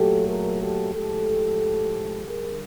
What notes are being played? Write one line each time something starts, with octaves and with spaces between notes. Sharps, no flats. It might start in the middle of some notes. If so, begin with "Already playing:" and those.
Already playing: A#2 F#3 A3 G4 A4
G#4 A#4
G4 A4
A2 F3 G#3 G4 A4
D3 G3 G#4 A#4